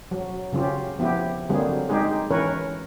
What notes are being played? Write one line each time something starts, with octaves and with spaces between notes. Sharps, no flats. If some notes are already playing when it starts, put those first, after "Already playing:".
F#3
C#3 F#3 C#4 F4 G4
F3 B3 E4 G4
D3 F#3 G3 A#3 C4 G#4
G#3 D#4 G4 G#4
E3 C#4 A#4 B4 C#5